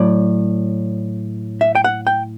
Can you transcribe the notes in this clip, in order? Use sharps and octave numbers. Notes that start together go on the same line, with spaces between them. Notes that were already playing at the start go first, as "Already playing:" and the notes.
Already playing: A2 F#3 D5
E5
G5
F#5
G5